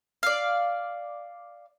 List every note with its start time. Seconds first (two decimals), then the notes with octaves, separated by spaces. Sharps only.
0.23 D5 F5